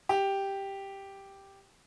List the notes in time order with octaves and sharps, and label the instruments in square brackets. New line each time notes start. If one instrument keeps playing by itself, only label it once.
[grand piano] G4